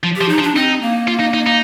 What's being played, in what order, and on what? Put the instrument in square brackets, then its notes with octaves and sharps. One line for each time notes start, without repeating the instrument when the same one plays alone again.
[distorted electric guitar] F3
[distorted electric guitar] F3 [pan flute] G4
[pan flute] D#4
[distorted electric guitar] F3
[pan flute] D4
[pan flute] C4 [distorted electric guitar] D#4
[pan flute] A#3
[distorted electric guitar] F4
D#4
D#4
D#4